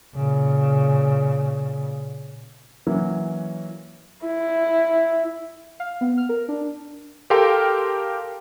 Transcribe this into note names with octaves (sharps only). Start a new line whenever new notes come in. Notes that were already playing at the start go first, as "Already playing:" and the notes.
A#2 C#3
E3 F#3 A#3 C#4
E4
F5
B3
F6
A#4
D4
G4 A4 A#4 F5 G5 C6